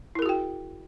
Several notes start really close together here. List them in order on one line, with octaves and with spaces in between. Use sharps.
E4 A#4 G#4 F#4 G5